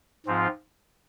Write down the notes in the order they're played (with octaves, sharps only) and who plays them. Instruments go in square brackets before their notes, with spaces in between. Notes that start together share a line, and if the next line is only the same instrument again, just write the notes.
[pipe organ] G#2 F3 C4 F4